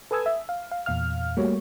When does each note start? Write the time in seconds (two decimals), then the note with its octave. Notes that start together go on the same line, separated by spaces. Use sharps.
0.11 A4 B4 G#5 D#6 E6 G#6
0.26 E5
0.49 F5
0.71 F5
0.86 E2 A#2 F5 F6
1.37 G3 A3 A#3 F#4 C#5